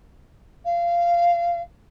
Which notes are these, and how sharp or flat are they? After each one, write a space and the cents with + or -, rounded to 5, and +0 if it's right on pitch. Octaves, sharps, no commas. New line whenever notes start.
F5 -20